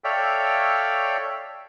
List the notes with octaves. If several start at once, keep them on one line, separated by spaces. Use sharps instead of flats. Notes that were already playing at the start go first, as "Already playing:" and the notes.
A4 C#5 D5 E5 F5 G5